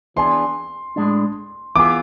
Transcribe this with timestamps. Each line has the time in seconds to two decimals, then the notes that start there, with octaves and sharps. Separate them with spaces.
0.16 E3 B3 D4 G#4 C6
0.96 A2 G#3 D4
1.76 E3 B3 F4 G#4 D6